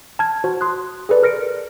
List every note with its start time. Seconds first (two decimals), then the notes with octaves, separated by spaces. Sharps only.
0.19 A5 F6 G#6
0.44 F#4 C5
0.61 C6 D#6 F#6
1.09 G#4 A4 B4 D5
1.23 A#4 F6 A#6 C#7 D7